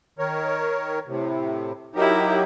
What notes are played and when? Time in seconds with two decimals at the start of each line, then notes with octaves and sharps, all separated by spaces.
0.19 D#3 A#4 C#5
1.07 A2 C3
1.95 F#3 D#4 E4 G4 A#4